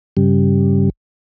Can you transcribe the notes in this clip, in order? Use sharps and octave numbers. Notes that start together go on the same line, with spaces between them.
G2 C#3 G3